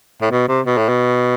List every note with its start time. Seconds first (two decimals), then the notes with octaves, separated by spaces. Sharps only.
0.21 A2
0.31 B2
0.48 C3
0.66 B2
0.77 A2
0.89 B2